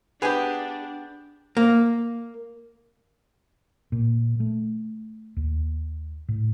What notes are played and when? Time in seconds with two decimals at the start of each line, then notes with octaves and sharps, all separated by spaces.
0.22 B3 D4 G4 G#4 G#5
1.57 A#3
3.92 A#2
4.40 A3
5.37 D#2
6.28 A2